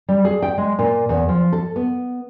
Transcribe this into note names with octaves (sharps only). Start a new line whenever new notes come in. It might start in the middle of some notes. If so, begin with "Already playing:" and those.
G3
G#4
G5
G#3
A#2
E2
F3
A4
B3